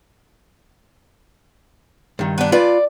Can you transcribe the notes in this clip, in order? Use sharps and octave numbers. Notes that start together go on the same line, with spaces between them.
G2 D#3
B3 D4
F4 B4 D5